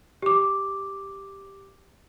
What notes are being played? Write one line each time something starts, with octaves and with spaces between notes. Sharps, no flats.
G4 D6